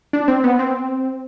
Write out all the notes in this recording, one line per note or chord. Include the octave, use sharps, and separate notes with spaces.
D4
C4
B3
C4